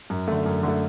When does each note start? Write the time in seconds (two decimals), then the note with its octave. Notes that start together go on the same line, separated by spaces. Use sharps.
0.10 F#2
0.28 D3 A3
0.46 F#2
0.63 D3 A3